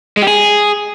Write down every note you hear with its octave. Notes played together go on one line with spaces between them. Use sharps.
G#3
G4
G#4